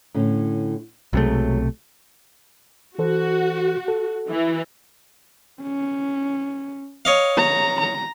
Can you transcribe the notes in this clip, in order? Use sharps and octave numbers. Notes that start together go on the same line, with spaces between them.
A2 D3 C#4
B1 C3 F#3 G#3 A3
E3 F#4 A4 C5
A4
E3
C#4
C#5 D#5 F5
A#5
A#5